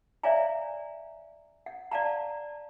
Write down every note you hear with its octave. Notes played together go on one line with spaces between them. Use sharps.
C#5 D5 E5 F5 G#5 A#5
F#5
D5 F5 F#5 A5 A#5